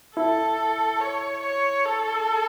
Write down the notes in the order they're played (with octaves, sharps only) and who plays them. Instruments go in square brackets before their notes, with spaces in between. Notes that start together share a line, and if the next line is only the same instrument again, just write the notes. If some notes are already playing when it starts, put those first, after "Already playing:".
[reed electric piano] E4 [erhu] A4
[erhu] C#5
C#5
A4